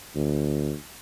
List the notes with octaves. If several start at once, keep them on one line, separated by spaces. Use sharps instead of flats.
D2